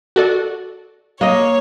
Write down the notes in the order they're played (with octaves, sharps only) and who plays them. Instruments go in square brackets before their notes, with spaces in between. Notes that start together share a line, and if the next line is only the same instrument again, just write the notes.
[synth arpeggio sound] F#4 A4 D5
[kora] A#3 D#5 [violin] C#5